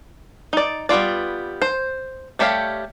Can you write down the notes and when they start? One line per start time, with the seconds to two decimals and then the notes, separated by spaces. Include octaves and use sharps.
0.53 D#4 D5
0.89 G3 B3 F4 D5
1.62 C5
2.39 G3 A3 G4 C#5 F5